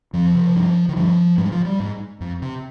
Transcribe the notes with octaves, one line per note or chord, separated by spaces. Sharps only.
F2 F3
C3
G2
D#3
G2 F3
G#2 G3
F3
G3
G#2
F2
C3